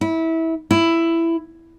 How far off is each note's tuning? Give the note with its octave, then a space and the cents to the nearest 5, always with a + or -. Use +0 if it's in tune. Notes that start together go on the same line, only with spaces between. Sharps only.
E4 -20
E4 +10